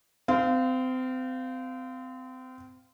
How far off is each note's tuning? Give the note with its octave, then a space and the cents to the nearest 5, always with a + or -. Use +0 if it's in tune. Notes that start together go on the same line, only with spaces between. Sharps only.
C4 -30 F5 -5